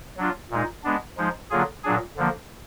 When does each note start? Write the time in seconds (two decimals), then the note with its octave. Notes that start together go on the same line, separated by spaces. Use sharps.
0.17 F#3 D4 F4
0.51 A#2 G#3 D#4
0.84 G#3 B3 D4
1.17 F3 G#3 D#4
1.50 D3 F#3 A#3 F4 G#4
1.84 A#2 F#3 D4 G#4
2.17 D3 F3 A#3